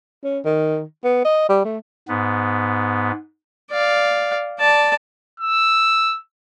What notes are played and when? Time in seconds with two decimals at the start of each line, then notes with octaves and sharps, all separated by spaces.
0.24 C#4
0.45 D#3
1.04 B3
1.25 D#5
1.49 G3
1.65 A3
2.08 G#2 B3
3.71 D5 F5
4.59 D5 A5
5.40 E6